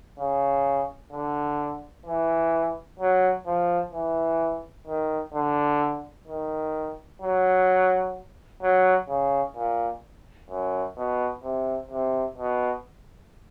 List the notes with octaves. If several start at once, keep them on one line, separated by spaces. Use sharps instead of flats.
C#3
D3
E3
F#3
F3
E3
D#3
D3
D#3
F#3
F#3
C#3
A#2
F#2
B2
C3
C3
B2